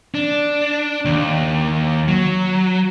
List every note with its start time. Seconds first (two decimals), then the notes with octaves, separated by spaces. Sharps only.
0.15 D4
1.05 D#2
2.08 F#3